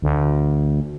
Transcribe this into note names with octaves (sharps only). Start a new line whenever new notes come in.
D2